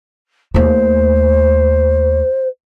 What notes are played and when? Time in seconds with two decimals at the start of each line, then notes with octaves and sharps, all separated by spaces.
0.54 D#2 A3 C5